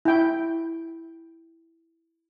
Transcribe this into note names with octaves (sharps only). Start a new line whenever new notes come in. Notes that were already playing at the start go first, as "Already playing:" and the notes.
E4 G5